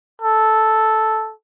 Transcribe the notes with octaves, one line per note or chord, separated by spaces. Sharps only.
A4